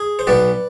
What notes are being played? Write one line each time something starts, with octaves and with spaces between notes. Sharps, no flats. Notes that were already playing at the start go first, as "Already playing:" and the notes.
Already playing: G#4
C5
B1 B2 B3 B4 D5